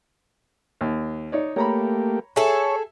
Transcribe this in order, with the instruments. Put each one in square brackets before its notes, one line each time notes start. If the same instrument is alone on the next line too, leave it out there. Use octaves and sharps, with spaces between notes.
[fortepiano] D#2
D#4 C#5 D5
[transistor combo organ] A3 A#3 G4 [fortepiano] C#5 A#5 B5
[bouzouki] G#4 A4 [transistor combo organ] C#5 [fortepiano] E5